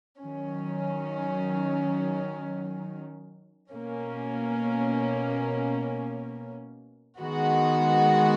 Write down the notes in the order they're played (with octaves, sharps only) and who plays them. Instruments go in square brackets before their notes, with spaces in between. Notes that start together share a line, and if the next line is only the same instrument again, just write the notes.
[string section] D#3 F#3 C#4
B2 A#3 C#4
D#3 G#3 B3 F#4